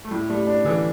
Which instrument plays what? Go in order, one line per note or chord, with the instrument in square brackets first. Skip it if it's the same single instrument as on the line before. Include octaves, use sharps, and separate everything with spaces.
[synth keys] A3
[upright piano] A2 [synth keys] G3
[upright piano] G3 [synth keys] A3
[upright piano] D4
[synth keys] D3 [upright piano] E3